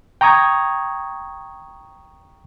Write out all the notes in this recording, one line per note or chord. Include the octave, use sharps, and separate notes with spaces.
G5 A#5 C#6 D#6 G#6